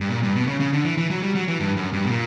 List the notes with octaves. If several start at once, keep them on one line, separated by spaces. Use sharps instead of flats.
G2
A#2
G2
B2
C#3
C#3
D3
E3
E3
F#3
G3
F#3
E3
G2
F#2
G2
B2
A#2